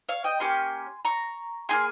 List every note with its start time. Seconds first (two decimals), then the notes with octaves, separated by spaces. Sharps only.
0.09 C#5 F5
0.24 D#5 G5
0.40 A#3 C#4 G4 G#5 C6
1.05 A#5 C#6
1.69 A#3 D#4 G#4 G#5 C6